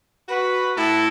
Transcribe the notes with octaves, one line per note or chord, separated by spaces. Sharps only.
F#4 B4
A2 E4 A4